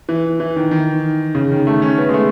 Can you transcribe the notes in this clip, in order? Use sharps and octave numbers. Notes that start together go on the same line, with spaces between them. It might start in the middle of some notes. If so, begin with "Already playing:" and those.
E3
E3
D#3
D#3
C#3
D#3
A3
C#4
B3
G#3
A3